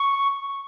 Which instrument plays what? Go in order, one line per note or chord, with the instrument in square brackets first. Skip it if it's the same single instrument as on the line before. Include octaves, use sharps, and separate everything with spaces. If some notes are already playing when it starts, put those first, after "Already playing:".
Already playing: [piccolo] C#6